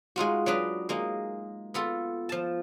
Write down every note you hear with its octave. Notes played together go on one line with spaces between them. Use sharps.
G#3 D#4 F4 F#4
F#3 D4 B4 D#5
G#3 A#3 D#4
B3 F4 A4
F3 A5